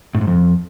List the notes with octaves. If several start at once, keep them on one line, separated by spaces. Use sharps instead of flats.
A2
G#2
F2